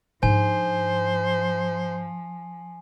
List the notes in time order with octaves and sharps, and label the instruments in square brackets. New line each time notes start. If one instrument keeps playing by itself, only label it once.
[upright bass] G#2 D4 [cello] F3 [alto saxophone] C5 [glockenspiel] G#5